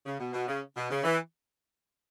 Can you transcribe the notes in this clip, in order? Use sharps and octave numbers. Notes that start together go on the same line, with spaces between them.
C#3
B2
B2
C#3
B2
C#3
E3